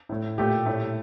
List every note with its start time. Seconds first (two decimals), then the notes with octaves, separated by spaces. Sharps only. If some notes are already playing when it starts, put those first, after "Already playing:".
0.09 A2 A3
0.38 A#2 A3 G4
0.66 A2 A3